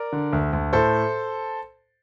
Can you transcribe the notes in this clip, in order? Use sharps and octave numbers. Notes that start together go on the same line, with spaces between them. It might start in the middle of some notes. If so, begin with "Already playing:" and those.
Already playing: A#4 D5
D3
D2
D2
A2 A4 C5